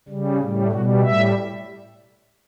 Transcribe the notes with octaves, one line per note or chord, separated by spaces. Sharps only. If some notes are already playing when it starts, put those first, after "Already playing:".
C#3 G3
A2 G3
B2 G3 F#4
A2 G3 E5